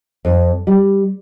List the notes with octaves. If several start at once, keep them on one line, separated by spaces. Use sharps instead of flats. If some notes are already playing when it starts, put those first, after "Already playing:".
F2
G3